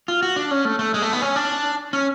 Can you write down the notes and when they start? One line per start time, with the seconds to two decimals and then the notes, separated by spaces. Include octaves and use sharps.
0.08 F4
0.22 F#4
0.36 D4
0.51 C#4
0.65 A3
0.79 A3
0.94 G#3
1.02 A3
1.13 B3
1.21 C#4
1.36 D4
1.93 C#4